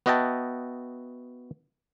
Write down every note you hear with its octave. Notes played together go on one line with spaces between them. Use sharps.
B3 F#4 D#5 E5 G5 A5